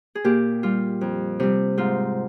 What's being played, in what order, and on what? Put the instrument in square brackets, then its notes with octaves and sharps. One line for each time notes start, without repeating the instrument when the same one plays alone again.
[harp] G#4
A#2 G4
G3 F4
F2
C3 G3
G#2 F4